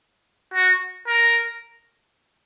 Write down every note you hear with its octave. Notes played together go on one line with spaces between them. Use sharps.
F#4
A#4